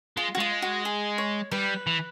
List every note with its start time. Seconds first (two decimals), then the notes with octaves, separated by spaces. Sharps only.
0.17 G#3 F4
0.35 F#4
0.38 G#3 F4
0.62 F#4
0.85 G#4
1.18 C#5
1.51 G3 B4
1.87 E3